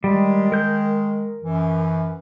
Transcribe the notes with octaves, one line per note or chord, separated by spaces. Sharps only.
D#3 G3 G#3
A#4 G6
F#2 E3